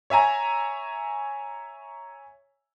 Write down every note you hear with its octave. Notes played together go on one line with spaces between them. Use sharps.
C#5 E5 G#5 A#5